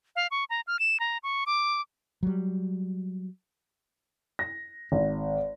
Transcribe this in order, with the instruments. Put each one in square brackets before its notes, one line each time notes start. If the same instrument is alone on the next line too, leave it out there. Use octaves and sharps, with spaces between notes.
[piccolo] F5
C#6
A#5
F6
E7
A#5
C#6
D6
[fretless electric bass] F#3 G3
[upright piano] A#6
G#1